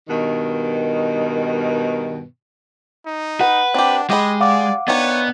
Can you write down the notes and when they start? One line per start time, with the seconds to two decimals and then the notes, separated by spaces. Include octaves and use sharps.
0.09 G2 B2 D#3
3.06 D#4
3.41 B4 F#5
3.74 C4 D4 G4
4.10 G#3 G4 D#5 B5
4.41 D5 F5 F#5 D6
4.88 D#3 B3 D4 C#5